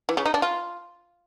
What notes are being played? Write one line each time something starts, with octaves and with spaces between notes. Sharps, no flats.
E3
C#3
D#4
D4
F4